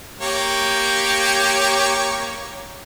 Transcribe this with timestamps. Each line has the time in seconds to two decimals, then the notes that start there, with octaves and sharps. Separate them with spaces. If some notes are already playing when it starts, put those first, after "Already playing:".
0.21 A#3 G4 C#5